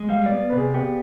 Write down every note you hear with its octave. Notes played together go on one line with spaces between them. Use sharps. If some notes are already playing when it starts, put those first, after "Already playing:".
Already playing: G#3
G3 F5
D5
B3
B4
C3 G#4
B3 G4